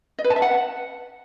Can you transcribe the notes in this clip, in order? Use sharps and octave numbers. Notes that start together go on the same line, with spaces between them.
D#5
B4
A5
E5
F#5